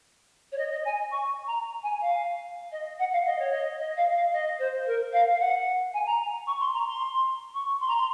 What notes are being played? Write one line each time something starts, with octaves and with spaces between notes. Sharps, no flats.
C#5
D#5
D#5
G#5
C#6
A#5
G#5
F5
D#5
F#5
F5
D#5
C#5
D#5
D#5
F5
F5
D#5
C5
A#4
F5
F5
F#5
G#5
A#5
C#6
C6
A#5
C6
C#6
C6
A#5
C6